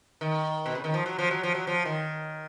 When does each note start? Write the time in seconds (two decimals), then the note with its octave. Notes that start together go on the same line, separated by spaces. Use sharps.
0.21 D#3
0.66 B2
0.75 C#3
0.84 D#3
0.94 F3
1.06 F#3
1.19 F3
1.31 F#3
1.43 F3
1.55 F#3
1.67 F3
1.85 D#3